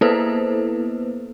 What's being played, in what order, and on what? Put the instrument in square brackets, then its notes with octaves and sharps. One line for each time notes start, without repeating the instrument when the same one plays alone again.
[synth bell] A#3 B3 E4 A4 B4 C5